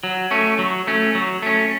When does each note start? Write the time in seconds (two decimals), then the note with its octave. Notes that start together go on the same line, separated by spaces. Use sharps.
0.04 F#3
0.31 A3 C#4
0.59 F#3
0.87 A3 C#4
1.15 F#3
1.42 A3 C#4